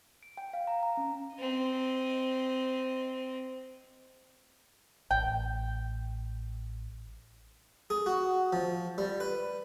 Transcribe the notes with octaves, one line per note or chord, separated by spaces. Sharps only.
D7
G5
F5
A#5
A#5
C#4
C4 D#5
A1 G5
G#4
F#4
F3
G3
B4